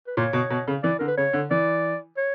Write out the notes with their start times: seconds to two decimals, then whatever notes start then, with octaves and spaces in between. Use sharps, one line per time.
0.07 B4
0.17 A#2 C#5
0.33 B2
0.50 B2
0.67 C#3
0.83 E3 D5
0.99 D3 A#4
1.08 B4
1.17 C#3 C#5
1.33 D3
1.51 E3 D5
2.17 C#5